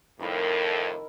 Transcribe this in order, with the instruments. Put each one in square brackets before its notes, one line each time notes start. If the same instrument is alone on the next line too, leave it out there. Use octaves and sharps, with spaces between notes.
[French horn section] F2 A2 [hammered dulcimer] D#3 E4 A#4